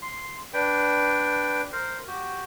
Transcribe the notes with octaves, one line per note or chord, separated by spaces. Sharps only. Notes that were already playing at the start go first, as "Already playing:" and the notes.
C6
D4 B4 G5
A#4 C5
F#4 G4